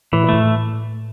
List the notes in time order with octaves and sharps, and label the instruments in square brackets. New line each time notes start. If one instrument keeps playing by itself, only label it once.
[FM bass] A2 [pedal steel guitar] E3
[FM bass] A#2
[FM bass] A2 [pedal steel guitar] A3